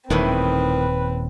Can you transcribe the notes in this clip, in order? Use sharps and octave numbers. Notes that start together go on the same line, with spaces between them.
D#1 A2 D#3 E3 C4 B4